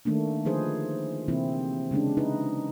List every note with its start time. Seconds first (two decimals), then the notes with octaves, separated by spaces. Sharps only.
0.05 D#3 A3 A#3 D4
0.45 D3 F3 D#4 G#4 B4 C5
1.28 C3 E3 A#3 C4 E4
1.91 C#3 G#3 C#4 D4
2.17 D#4 E4 B4